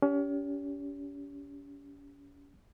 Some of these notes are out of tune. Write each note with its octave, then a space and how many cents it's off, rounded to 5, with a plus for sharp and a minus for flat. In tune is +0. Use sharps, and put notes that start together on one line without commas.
C#4 +35 G4 +0